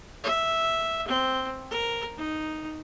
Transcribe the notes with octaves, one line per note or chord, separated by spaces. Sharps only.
E5
C4
A#4
D#4